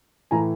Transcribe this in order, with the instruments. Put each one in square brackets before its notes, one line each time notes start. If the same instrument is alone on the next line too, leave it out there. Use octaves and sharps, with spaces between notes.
[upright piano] A2 E3 G#5 A#5